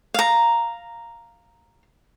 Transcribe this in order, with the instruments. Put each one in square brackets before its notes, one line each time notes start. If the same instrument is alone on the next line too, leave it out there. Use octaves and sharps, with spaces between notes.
[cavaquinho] F5 A#5